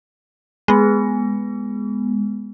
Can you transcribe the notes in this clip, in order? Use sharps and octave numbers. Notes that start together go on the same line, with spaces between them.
G#3 B3